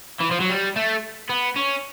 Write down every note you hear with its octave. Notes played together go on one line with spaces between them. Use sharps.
E3
F3
F#3
G3
A3
B3
C#4